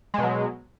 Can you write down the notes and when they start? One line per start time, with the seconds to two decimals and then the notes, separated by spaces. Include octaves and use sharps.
0.14 G#3
0.18 B2
0.23 F#3